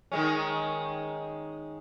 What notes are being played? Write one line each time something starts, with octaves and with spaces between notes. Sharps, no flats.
D#3 G#3 C#4